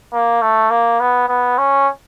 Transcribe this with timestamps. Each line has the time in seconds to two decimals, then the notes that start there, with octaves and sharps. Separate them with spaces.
0.13 A#3
0.42 A3
0.71 A#3
1.01 B3
1.29 B3
1.58 C#4